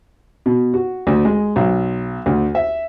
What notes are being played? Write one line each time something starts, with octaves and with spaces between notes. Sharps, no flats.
B2
F#4
D2
G#3
B1
D2
E5